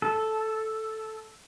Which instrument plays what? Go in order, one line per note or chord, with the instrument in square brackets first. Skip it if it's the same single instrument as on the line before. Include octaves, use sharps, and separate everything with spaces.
[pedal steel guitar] A4